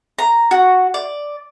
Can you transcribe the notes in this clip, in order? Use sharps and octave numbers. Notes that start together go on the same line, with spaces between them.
A#5
F#4
D5